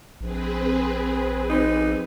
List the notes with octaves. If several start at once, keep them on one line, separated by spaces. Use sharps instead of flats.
A#1 C4 G#4 B4
D#4